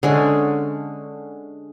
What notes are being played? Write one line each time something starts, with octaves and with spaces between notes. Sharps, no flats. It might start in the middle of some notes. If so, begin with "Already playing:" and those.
D3 G#3 C#4